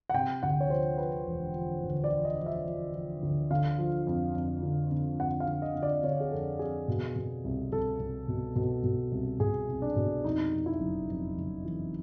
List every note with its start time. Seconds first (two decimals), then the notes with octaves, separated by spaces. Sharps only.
0.10 F#5
0.14 C3 G5
0.43 D2 F#5
0.60 C#5
0.70 F3 C5
0.98 F3 B4
1.27 E1
1.54 F3
1.83 D2
2.04 D5
2.11 F3
2.25 D#5
2.39 F3
2.46 E5
2.67 F3
2.95 F3
3.23 D2
3.50 D3 F5
3.78 F3
4.07 F2
4.35 F2
4.63 D3
4.92 D3
5.19 F2 F#5
5.40 F5
5.48 D3
5.62 D#5
5.75 D3
5.83 D5
6.03 D3 C#5
6.20 G#4
6.31 F2 A4
6.59 F2 G#4
6.88 B2
7.16 B2
7.44 C2
7.72 C2 A4
7.99 C2
8.28 B2
8.56 B2
8.84 B2
9.12 C2
9.40 B2 G#4
9.69 C2
9.82 D4
9.96 B2
10.24 F2 D#4
10.53 F2
10.66 E4
10.80 F#1
11.08 F2
11.37 F#1
11.65 E3